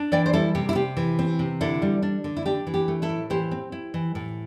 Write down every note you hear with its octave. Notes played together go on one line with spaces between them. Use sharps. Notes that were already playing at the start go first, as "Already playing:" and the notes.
Already playing: D4
E3 D5 G5
C5
G3 E4 A4
C3 G4
E4
C3 G4
E3
C4
C3
D3 E4 A4
G3
D4
D3
E4
D4 G4
E3
G4
A3
E4 A4
A2
E3 G4 C5
C4
E4
E3
A2